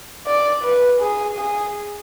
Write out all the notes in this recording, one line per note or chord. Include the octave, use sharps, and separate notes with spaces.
D5
B4
G#4
G#4